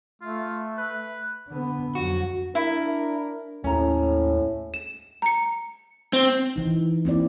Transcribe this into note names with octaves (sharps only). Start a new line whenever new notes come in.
A3 F4
B4
D3 B3
F2 F#3 F#4
D4 E4 A#4
D#2 A2 C#4 A#5
E7
A#5 C#7
C4
E3 D#4
A#3 C4 E4 D5